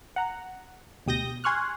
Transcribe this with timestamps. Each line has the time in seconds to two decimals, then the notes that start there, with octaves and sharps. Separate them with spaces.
0.16 F#5 A#5
1.06 D2 B2 G4 D#6 G6 A#6
1.44 G#5 C6 C#6 F6 F#6